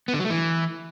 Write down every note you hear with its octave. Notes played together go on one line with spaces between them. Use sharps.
B3
D3
F#3
A3
E3